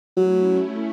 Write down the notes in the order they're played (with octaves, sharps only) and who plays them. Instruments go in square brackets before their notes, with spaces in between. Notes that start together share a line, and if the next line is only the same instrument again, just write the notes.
[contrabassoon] F#3 [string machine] A3 C#4 E4